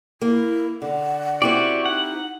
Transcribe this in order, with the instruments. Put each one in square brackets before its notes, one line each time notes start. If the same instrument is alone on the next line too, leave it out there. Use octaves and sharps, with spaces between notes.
[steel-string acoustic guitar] A#3 [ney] E4
[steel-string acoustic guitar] D3 [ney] F#5
[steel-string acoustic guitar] C4 E4 G4 [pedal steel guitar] F#4 D5
[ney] D#4 [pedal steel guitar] F#5